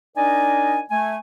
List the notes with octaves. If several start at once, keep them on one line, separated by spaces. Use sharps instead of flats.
D4 D#4 A#4 D5 D#5 G#5
A3 G#5